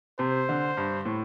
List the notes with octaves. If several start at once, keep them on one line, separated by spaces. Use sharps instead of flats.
C3 C5
D3
G2
A2